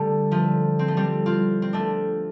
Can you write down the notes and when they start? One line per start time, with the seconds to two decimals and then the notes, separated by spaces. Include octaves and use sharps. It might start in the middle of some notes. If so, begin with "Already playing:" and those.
Already playing: D3 G3 A3
0.31 F3 A3
0.79 C4
0.88 A3
0.97 G3 C4
1.26 C4 F4
1.62 C4
1.73 A3 D4